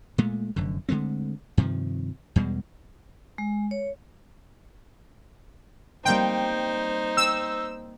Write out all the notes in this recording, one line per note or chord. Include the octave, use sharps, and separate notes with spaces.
A#2 G#3 A3
F1 F#2 D3
D3 G#3 A3 C4
G2 C3 D#3 F3
E2 B2 G3 G#3
G#3
C#5
G3 A#3 C4 D#4 C5 G5
C4 E6